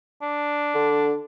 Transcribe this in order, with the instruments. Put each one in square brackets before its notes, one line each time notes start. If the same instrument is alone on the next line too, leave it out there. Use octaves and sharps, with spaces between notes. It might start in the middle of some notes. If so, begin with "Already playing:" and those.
[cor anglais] D4
[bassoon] D3